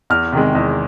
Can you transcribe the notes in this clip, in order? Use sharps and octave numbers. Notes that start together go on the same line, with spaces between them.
E2 F6
C3 D#3 G#3
E2